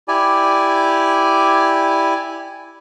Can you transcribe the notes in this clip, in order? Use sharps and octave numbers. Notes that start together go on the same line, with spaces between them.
E4 G4 D5 G#5